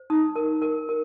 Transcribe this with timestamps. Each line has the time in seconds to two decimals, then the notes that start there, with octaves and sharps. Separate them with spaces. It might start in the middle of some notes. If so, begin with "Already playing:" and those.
Already playing: C5
0.10 D#4 D#6
0.36 A#4
0.62 A#4
0.89 A#4